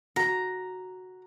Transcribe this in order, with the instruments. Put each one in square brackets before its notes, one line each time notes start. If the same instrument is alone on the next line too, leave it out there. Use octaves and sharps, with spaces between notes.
[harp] F#4 [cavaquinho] A#5